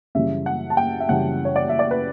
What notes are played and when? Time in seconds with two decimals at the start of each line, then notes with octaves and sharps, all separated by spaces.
0.15 F#2 C#3 E3 G3 E5
0.46 F#5
0.70 A5
0.77 G5
1.00 E5
1.09 F#2 C#3 E3 G3 F#5
1.45 C#5
1.56 D5
1.69 E5
1.79 D5
1.91 B4